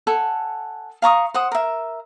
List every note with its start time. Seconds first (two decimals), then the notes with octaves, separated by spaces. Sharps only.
0.07 A4 F#5 G#5
1.02 F5 A#5 C#6 D#6
1.34 C5 F#5 D#6
1.52 A#4 E5